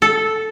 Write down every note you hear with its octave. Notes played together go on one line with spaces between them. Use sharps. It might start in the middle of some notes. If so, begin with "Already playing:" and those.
A4